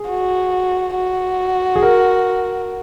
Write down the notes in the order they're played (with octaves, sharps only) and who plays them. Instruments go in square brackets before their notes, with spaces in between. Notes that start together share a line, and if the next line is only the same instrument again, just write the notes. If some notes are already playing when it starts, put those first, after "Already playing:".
Already playing: [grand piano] G#4
[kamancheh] F#4
F#4
[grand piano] G#4
A#4